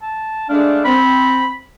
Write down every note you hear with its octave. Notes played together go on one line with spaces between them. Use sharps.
A5
G#3 A3 D4 F5
C4 B5